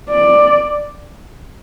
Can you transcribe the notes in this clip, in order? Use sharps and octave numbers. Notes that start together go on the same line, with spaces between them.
D5